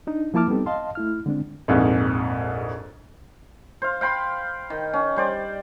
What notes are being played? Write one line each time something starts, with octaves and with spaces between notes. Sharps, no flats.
D4 D#4
F3 A#3 E4 A5 D6 F6
G3 B3 C4 D#4 G4 A4
D#5 F5 A5 C6
A3 E4 F6
D3 G#3 C4 D4
A#1 F2 G#2
C5 F5
F5 G5 B5 C6
D#3
C#4
G3 C5 D5